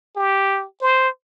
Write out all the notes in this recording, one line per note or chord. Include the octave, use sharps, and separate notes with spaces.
G4
C5